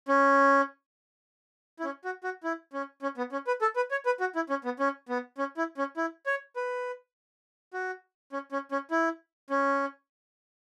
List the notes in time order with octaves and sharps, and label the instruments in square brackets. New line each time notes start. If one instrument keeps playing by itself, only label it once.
[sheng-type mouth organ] C#4
E4
C#4
F#4
F#4
E4
C#4
C#4
B3
C#4
B4
A4
B4
C#5
B4
F#4
E4
C#4
B3
C#4
B3
C#4
E4
C#4
E4
C#5
B4
F#4
C#4
C#4
C#4
E4
C#4